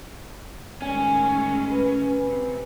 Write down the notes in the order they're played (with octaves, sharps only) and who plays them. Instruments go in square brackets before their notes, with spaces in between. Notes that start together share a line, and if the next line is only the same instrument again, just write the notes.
[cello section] A2 D#3 G#3 [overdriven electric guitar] C#4 [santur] G#5
[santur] B4
[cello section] C3